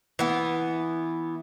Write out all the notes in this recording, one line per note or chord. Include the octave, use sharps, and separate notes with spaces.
E3 B3